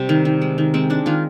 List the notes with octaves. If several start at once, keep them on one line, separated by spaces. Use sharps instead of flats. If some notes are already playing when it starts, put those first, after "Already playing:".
Already playing: C3 G3 C4
D#3
D#3
G#3
D#3
G#3 C4
G#3 D4
D#3 F4